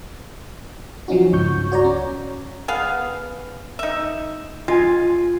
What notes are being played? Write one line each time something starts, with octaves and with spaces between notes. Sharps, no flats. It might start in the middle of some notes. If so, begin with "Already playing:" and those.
F3 F#3 C#4 D#4 F#4
C#2 G2 C#6 G6
F#4 C#5 D5 A#5
C#4
B3 G#4 F5
D#4 E5
G#3 F4 G#5